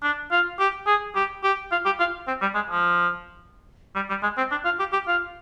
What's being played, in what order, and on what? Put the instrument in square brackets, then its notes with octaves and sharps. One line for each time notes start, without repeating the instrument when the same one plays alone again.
[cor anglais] D4
F4
G4
G#4
G4
G4
F4
G4
F4
C4
G3
G#3
F3
G3
G3
G#3
C4
D4
F4
G4
G4
F4